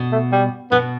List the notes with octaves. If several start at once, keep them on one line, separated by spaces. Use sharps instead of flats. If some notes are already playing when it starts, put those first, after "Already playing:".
Already playing: B2
A3
G3
B2 B3